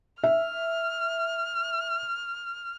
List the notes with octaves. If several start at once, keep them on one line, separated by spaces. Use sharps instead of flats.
E5 F6